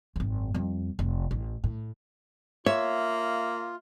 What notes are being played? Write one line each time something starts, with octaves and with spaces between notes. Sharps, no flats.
G#1 F#2
F2 G3
F1
A1
A2
A#3 F4 C#5 E5